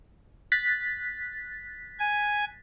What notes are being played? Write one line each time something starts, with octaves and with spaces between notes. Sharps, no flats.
F#6 A6 B6
G#5